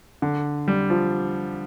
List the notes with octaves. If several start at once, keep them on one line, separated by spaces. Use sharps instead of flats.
D3
G3
F3